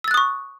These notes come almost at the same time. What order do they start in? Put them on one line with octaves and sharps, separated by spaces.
E6 A6 F#6 D#6 C#6